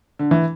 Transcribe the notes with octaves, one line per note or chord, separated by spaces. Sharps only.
D3
E3